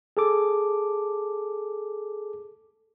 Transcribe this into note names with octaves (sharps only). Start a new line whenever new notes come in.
G#4 A4 D6